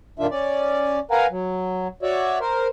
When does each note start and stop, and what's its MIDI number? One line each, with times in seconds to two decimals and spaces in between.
0.19 0.27 41
0.19 0.27 46
0.19 0.27 51
0.19 0.27 62
0.19 0.27 65
0.19 0.27 76
0.31 0.99 61
0.31 0.99 74
1.11 1.26 70
1.11 1.26 71
1.11 1.26 77
1.11 1.26 78
1.11 1.26 80
1.11 1.26 82
1.31 1.88 54
2.03 2.39 66
2.03 2.39 73
2.03 2.39 74
2.03 2.39 76
2.40 2.68 70
2.40 2.68 72